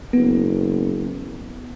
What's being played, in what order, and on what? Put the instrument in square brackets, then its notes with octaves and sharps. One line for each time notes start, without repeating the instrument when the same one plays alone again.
[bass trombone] F#1 [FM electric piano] B3